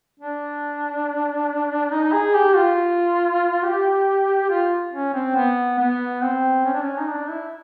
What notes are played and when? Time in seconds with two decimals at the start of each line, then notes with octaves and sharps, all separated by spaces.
0.20 D4
1.92 D#4
2.13 G#4
2.35 G4
2.56 F4
3.64 G4
4.50 F4
4.93 C#4
5.14 C4
5.36 B3
5.79 B3
6.23 C4
6.65 C#4
6.74 D4
6.82 C#4
6.99 D#4
7.09 D4
7.30 E4